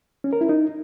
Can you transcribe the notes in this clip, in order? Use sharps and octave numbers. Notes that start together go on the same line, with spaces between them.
C#4
A#4
E4
D#4